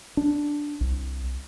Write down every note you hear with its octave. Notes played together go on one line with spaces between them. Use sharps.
D4
C2